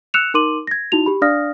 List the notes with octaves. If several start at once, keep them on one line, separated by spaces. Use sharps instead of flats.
E6 F#6 C#7 E7 F7
D#4 A#4 C6 D6 D#7 F#7
G#6 A#6
D#4 E4 F#4 F7
G4 B5
D4 D5 F5 D#6 F6 A#6